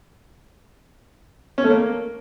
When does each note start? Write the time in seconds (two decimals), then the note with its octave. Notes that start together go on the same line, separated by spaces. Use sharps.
1.58 C#4
1.64 A3
1.70 A#3